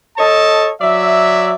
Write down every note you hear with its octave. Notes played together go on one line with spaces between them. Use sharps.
A4 C#5 D#5 A5
F#3 D5 E5